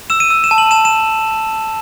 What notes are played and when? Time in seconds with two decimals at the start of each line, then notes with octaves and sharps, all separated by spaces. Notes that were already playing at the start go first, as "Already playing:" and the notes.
0.10 E6 E7
0.20 D#7
0.30 E6
0.44 E7
0.51 A5
0.58 F#7
0.71 A5 E7
0.85 E7